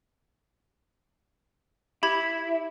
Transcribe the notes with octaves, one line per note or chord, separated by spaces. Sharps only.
E4 G4 B5 G#6